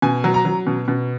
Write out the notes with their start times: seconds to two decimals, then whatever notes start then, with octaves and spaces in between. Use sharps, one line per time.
0.02 B2 G#5
0.24 F#3
0.34 A#5
0.45 F#3
0.67 B2
0.88 B2